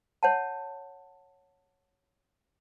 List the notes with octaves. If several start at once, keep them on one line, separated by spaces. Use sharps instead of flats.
C#5 F#5 A5